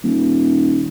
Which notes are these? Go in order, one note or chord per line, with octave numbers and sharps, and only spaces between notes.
D#1